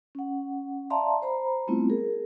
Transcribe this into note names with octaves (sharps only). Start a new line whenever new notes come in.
C#4 F#5
D5 E5 F5 A5 A#5 C6
C5 A#5 B5
G3 A3 B3 C4 E4 F4
G#4 A#4